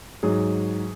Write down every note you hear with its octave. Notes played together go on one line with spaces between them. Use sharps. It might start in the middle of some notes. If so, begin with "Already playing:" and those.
G#2 F#3 G#4